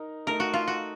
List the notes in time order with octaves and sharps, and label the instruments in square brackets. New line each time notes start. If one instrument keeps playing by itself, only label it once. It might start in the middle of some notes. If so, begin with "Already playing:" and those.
Already playing: [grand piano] D#4 A#4
[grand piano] A3 D#4 A4 [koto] A#4
[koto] F#4
F4
F#4